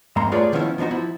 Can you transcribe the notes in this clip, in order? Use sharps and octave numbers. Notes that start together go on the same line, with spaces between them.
F2 G#2 A#3 A#5 C6
A3 F4 G#4 B4 C#5 D5
D#3 F3 B3 C#4 E4
F3 B3 D4 D#4 F#4
F3 E4